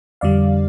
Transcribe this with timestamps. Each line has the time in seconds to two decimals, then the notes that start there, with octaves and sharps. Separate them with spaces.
0.21 F2 D3 G3 D5 F5